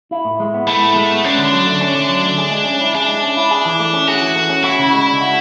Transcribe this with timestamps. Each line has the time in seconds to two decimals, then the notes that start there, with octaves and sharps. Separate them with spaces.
0.11 E4
0.25 A2
0.40 G#3
0.54 B3
0.67 A3 E4
0.82 A2
0.96 G#3
1.11 B3
1.24 C#4 D4
1.38 D3
1.53 F#3
1.67 A3
1.81 C#4
1.95 D3
2.09 F#3
2.23 A3
2.38 G#4
2.51 G#3
2.66 C#4
2.81 E4
2.95 D4 G#4
3.08 G#3
3.23 C#4
3.37 E4
3.51 G#4
3.65 E3
3.80 A3
3.93 C#4
4.08 F#4 G#4
4.21 E3
4.36 A3
4.50 C#4
4.64 E4 F#4
4.79 C#3
4.93 G#3
5.07 D4
5.21 F#4